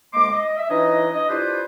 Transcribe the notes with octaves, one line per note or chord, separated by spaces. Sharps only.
D2 G#3 A#3 D#5 C6 D6
D#5
E5
E3 D4 D#4 C#5 D#5
D#5
D4 E4 F4 G4 B4 C5